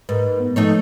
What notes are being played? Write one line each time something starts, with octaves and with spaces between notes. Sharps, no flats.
G#2 A#4 B4
B3
F3 A3 D#4 C#5